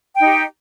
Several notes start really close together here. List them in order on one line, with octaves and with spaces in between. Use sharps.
G5 D#4 G4